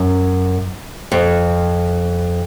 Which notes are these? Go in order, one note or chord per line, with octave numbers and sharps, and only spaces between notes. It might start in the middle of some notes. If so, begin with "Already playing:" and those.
Already playing: F#2
F2